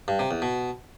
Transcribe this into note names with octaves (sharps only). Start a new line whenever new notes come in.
G2
C3
E2
B2